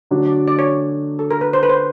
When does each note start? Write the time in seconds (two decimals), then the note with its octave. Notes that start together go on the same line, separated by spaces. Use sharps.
0.11 D3 F#3 A3 D4 F#4
0.26 D5
0.48 D5
0.59 C#5
1.19 A4
1.31 A#4
1.41 B4
1.53 C5
1.63 B4
1.69 C5